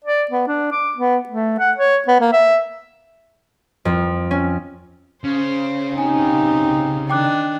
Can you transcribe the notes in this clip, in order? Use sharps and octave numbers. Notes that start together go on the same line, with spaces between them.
D5
B3
D4
D6
B3
A3
F#5
C#5
B3
A#3
E5
F2
C#4
C#3 C5
C4 D#4 G4 G#5
D#3 D4 G5 D6 F#6